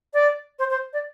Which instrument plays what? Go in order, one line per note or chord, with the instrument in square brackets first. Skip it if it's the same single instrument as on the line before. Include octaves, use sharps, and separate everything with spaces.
[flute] D5
C5
C5
D5